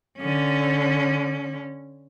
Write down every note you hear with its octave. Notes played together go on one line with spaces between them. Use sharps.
D3 C#4